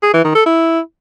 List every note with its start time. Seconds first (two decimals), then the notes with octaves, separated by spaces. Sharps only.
0.03 G#4
0.14 E3
0.24 D#3
0.35 A4
0.46 E4